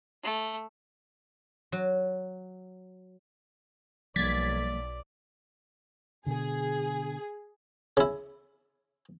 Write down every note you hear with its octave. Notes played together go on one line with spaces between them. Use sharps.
A3
F#3
B1 F3 G3 A#3 D5 G#6 A6 B6
B2 D3 G#4
C#3 E4